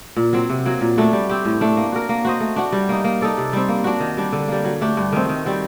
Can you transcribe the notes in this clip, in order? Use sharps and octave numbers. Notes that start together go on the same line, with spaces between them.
A#2
F#3 C4
C3
F#3 A#3
A#2
F#3 A3 D4
G3
C4 G4
A2
A3 D4
A#3
F#4 A#4
A#3
F#4 C5 D#5
A3
D4 F#4
G3
A#3 D#4
A#3
D#4 A4 D5
C3
G3 C4
A#3
D4 F#4
D#3
G3 D4
D3
G3 A#3
F#3
A3 D4 G4
G2
D#3 A3 C4
D#3
G3 C4 F#4